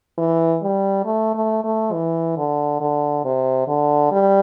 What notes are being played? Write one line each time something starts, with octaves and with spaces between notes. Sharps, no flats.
E3
G3
A3
A3
A3
E3
D3
D3
C3
D3
G3